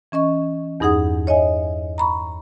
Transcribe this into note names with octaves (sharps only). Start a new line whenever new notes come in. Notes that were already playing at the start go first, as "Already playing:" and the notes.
E3 C#4 D#5 C#6
E2 G2 D#4 G#4 F#5 D#6
C#5 D#5 E5 G#5
A#5 B5 C#6